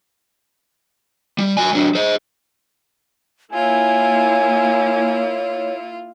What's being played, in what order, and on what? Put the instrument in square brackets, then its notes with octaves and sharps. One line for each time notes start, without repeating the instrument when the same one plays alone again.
[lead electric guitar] G3
F#3 G#5
F#3 D4
G#4 C5
[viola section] A#3 E4 [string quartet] F4 [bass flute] C#5 [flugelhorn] G#5